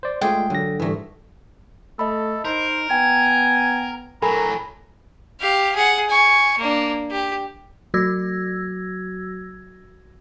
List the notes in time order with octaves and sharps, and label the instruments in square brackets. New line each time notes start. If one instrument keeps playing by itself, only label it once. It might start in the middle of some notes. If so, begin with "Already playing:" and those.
[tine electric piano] C5 D5
[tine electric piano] G#3 A3 F4 [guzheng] G#4 D5 [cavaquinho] G5
[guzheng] D3 [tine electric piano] F#3 A#6
[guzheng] G#2 A3 [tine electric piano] E3 G3
[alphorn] A3 [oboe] A4 [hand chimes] D#5 B5
[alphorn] D#4 [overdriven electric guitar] A#4 [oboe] C5
[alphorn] B3 [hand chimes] G5 [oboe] G#5
[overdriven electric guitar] A2 F#3 [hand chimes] A4 G#5 B5 [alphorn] A#4 [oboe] A#5
[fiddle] G4 F5
G#4 F#5
G#5 C#6
A#3 D4
G4
[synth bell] F#3 F#4 E6 G#6 A#6